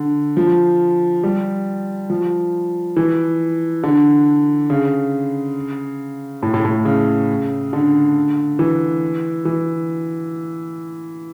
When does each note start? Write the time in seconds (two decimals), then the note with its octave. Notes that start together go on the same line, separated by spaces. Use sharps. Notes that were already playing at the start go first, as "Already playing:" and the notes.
Already playing: D3
0.37 F3
1.23 G3
2.10 F3
2.96 E3
3.83 D3
4.70 C#3
6.43 A2
6.54 A2
6.65 A2
6.85 C#3
7.73 D3
8.59 E3
9.45 E3